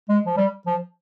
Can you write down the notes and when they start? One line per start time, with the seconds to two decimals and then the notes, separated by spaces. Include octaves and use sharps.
0.09 G#3
0.26 F3
0.37 G3
0.66 F3